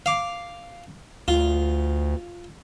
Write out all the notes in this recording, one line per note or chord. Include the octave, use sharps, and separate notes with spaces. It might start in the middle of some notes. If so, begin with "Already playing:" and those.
F5 D6
D2 F4